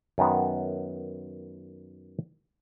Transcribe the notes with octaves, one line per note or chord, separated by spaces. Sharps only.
F#2 D#3 B3